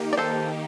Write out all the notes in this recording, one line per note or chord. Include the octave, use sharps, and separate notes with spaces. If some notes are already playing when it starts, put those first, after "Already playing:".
Already playing: D#3 A#3 D#4 G4
D5
A4 C5